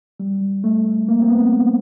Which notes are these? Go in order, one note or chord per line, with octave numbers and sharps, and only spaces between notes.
G3
A3
A#3
C4
B3